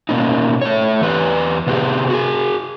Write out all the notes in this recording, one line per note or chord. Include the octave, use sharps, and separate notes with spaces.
B2 A#3 C#4 D#4
A3 C#5
E2 E3 G4 B4
C3 B3 G4 G#4
F#4 G#4